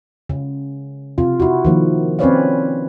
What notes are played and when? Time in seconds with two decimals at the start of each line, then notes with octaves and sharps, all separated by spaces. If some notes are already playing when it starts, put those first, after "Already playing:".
0.29 C#3
1.18 C3 F4
1.40 E4 F#4
1.65 D#3 F3 A#3
2.19 C4 C#4 B4 C#5 D5 F5